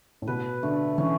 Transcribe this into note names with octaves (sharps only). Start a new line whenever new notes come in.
A2
B2 B4
D3 A3
E3 C#4